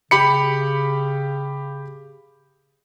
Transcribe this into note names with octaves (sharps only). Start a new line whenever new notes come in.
C#3 G4 B5 C#7